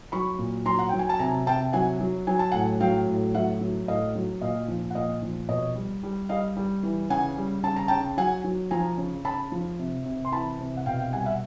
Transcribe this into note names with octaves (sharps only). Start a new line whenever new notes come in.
F#3 B5 C#6
A#2
F#3 A#5 C6
F#5
F#3 G5
G#5
A5
C3 G#5 A#5
C3 G5 A5
F#3 F#5 G#5
F#3
F#3 G#5
A5
A2 F#5 G#5
F#3 F5 G5
A2
F#3 E5 F#5
F#3
A2 D#5 F5
F#3
A#2 D#5 F5
F3
F#5
A#2 D#5 F5
F3
B2 C#5 D#5
G3
G3
G3 D#5 F5
G3
E3
C#3 F#5 G#5
G3
C#3 A5
A#5
C#3 G5 A5
F#3 F#5 G#5
F#3
F3 G#5 A#5
C#3
C#3 A5 B5
F3
C3
C3
C6
E3 A5 B5
C3
F#5
B2 F5 G5
F5 G5
G3 F#5 G#5
E5 F#5